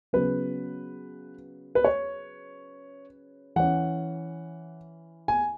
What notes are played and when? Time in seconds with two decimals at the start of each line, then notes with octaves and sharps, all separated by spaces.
0.13 C#3 F#3 B3 B4
1.75 B4
1.84 C#5
3.56 E3 C#4 F#5
5.28 G#5